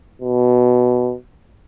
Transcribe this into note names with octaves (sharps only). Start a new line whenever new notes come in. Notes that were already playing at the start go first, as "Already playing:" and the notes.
B2